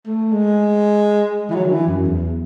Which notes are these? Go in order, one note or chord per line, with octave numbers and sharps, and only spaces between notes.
A3
G#3
E3
F#3
D#3
E3
F#2
E2